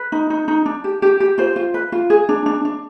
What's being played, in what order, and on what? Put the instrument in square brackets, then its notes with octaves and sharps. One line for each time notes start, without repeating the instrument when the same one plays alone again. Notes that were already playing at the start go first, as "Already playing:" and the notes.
Already playing: [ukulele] B4
D#4
D#4
D#4
D4
G4
G4
G4
F4 C5
F4
B4
F4
G#4
D4
D4
D4